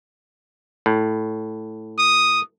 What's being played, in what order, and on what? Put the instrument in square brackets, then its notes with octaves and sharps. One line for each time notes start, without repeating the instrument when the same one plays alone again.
[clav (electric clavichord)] A2
[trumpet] D#6